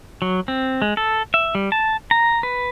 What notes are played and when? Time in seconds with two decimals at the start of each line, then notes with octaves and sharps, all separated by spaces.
0.22 F#3
0.48 C4
0.82 G#3
0.97 A4
1.34 E5
1.55 G3
1.72 A5
2.11 A#5
2.43 B4